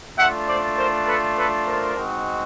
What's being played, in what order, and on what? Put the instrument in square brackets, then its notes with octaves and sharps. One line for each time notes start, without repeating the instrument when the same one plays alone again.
[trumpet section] A3 D4 F4 E5 F#5
C5 D5
A#4 C5
A4 B4
A4 B4
A#4 C5
G#3 C4 D#4 F#4